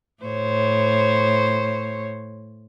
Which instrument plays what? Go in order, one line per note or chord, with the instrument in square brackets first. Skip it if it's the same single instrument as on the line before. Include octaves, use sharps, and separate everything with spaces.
[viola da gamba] A2 C5 C#5